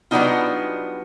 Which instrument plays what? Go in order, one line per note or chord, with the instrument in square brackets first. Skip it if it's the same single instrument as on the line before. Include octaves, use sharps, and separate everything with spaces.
[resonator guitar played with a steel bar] F#3 G3 B3 D4 D#4 F4